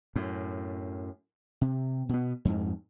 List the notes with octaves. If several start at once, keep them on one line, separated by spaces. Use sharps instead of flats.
F#2 A2
C3
B2 B3
F2 G#2